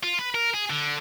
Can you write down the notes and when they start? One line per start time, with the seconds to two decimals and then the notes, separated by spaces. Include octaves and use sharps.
0.03 F4
0.19 B4
0.35 A#4
0.54 G#4
0.70 D3